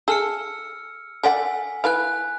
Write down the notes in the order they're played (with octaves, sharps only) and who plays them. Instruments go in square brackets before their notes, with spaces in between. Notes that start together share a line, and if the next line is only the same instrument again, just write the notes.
[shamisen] G#4 A4 [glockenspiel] E6 F6 C#7
[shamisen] A4 D5 F#5 [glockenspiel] G#5 B6
[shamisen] E4 B4 F5 [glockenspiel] G#5 F#6